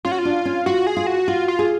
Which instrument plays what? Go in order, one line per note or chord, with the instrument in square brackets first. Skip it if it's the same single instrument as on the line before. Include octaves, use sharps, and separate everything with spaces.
[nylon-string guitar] C#4 [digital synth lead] F4
[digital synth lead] F#4
F4
[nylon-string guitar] D4
C#4
[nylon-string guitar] F4 [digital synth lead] F#4
[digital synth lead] G#4
[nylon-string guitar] F4
[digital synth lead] F#4
[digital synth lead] F4 [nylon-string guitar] F#4
[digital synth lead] F4
[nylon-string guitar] G#4